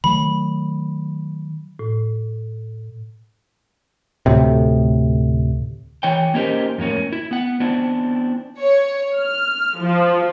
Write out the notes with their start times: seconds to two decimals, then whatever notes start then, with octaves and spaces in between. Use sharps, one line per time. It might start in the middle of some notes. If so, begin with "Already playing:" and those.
0.04 D#3 F#3 A3 B5
1.79 A2
4.26 D2 A2 C3
6.03 E3 C#5 G5
6.34 A#3 C#4 D#4 G4 A#4 C5
6.78 F2 A2 A#3 C#4
7.12 E4
7.31 B3 F#5
7.60 B3 C4 D4 E4
8.59 C#5
9.16 F6
9.80 F3